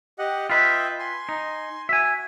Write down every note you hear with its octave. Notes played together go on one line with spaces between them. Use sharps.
G4 D#5 F#5
F4 B4 D#5 E5 G5
G#5 C6
D#4
F#4 E5 G#5